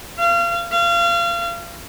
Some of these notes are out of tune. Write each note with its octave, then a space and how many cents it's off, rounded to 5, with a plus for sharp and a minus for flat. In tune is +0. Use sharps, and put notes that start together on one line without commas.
F5 -30
F5 -30